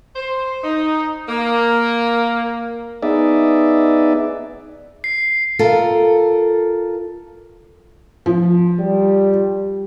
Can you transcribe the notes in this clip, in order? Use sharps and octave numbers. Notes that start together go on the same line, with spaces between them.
C5
D#4
A#3
B3 D#4 G#4 D5 E5
C7
F4 A4 A#4
F3
G3